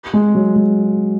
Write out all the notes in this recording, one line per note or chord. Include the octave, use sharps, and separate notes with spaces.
G#3
F#3
G#3